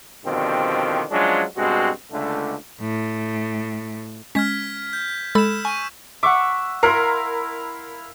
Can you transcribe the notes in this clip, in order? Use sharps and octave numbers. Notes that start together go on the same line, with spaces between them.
B2 D3 D#3 F3 G3 C4
F3 F#3 G#3 C#4 D4 F4
G2 B2 G#3 C4 F#4
C#2 D3 A3
A2
G#3 C#4 F6 G#6 B6
G6
G#3 A4 B5 E6 E7
G#5 C#6 D#7
E5 F#5 C#6 D6
E4 A#4 F5 C6 D7